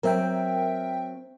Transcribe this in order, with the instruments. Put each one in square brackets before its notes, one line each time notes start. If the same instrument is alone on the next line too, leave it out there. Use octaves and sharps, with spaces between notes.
[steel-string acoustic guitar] F#3 C4 [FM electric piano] A#4 E5 G5